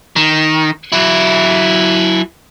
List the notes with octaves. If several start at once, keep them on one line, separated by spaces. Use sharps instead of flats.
D#3
F#3 E4